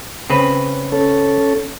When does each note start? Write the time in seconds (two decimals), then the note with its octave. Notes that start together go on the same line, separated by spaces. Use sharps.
0.30 C#3 C4 B4
0.92 C#4 A4